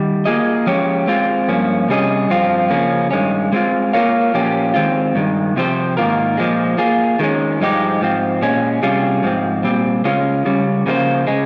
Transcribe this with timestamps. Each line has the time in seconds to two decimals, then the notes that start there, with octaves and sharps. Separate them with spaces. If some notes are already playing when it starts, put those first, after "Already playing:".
Already playing: D#3 G3
0.25 A#3 F4 G#4 D#5
0.66 F3 G#3 C#4 G4 C#5
1.08 G#3 C4 F4
1.48 G2 F3 A#3 C#4
1.89 C3 G3 C#4 G#4 D#5
2.30 G2 F3 C4 F4
2.70 C#3 F3 A#3 C#4
3.11 G2 D#3 G#3 C#4
3.52 G#3 C4 F4
3.93 A#3 F4 A#4 C#5 F5
4.34 A#2 F3 A#3 C#4 G4
4.74 D#3 G#3 C4 F4
5.15 G2 D#3 G#3
5.56 C3 F3 C4 G4 C5
5.97 G#2 D#3 A#3 F4 A#4
6.37 A#2 F3 G#3
6.78 A#3 F4 G#4
7.19 D#3 G#3 C#4
7.60 G2 F3 G#3 D#4 G4
8.01 G#2 F3 C4
8.42 A#2 G#3 C#4
8.82 C3 G3 C#4 F4 G#4
9.23 G#2 F3 C4
9.64 A#2 G3 C4
10.05 C#3 G#3 C#4 F4
10.46 C#3 G3 C#4
10.86 C#3 F3 A#3 F4 C5
11.27 C#3 G#3